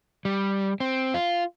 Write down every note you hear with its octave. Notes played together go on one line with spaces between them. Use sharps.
G3
C4
F4